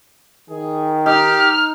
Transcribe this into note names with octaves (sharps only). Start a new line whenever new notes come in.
D#3 G#4
D#4 G4 F6